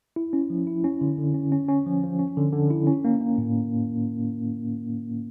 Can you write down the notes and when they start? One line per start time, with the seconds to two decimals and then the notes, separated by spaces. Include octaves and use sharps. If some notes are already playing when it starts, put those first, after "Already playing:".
0.16 E4
0.33 C#4
0.50 F3
0.67 E4
0.84 C#4
1.01 D3
1.18 D3
1.34 C#4
1.52 C#4
1.68 C#4
1.86 F3
2.03 F3
2.19 C#4
2.37 D3
2.53 D3
2.70 E4
2.87 C#4
3.05 A#3
3.21 A#3
3.38 A2